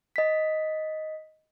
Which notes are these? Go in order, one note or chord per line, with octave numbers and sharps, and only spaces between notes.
D#5 B6